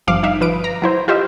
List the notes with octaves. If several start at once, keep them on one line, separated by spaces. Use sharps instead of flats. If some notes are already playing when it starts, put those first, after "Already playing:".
G1 F3 F5 D6
D#4 E5 F5
F3 B4 D#6 D7
A#5
F#3 E4 C5
F4 G4 C5 D#5 E5